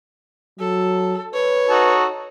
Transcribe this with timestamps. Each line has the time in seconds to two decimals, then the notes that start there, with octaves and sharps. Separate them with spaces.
0.59 F#3 A4
1.34 B4 C#5
1.69 D#4 F#4 A4